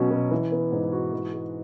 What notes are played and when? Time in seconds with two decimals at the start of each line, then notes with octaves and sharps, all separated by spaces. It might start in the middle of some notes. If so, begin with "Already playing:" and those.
Already playing: B2 F#3 C#4
0.11 B2
0.31 E3
0.52 B3
0.72 G#2
0.93 F#4
1.13 E3
1.33 G#3